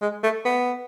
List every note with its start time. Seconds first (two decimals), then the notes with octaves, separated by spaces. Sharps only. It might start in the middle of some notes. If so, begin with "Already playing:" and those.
0.02 G#3
0.23 A3
0.45 B3